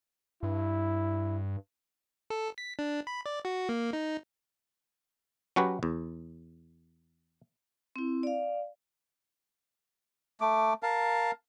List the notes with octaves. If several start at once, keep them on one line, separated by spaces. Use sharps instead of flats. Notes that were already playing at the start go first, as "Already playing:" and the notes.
G2 E4
A4
B6
D4
B5
D5
F#4
A#3
D#4
F#3 C#4 F#4 G4 B4
E2
C4 E4
D5 F5
A3 D6
A#4 F5 A5